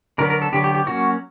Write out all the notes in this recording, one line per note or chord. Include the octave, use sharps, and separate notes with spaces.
D3 F#3 B3 A#4
A#4
A4
D3 F#3 B3 G4
G4
G4
F#3 A#3 C#4 F#4